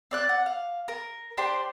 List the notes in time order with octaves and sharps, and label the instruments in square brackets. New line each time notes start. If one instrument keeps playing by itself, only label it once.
[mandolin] C4 D5 F#6
F#5
F5
A#4
D4 G4 C5 C6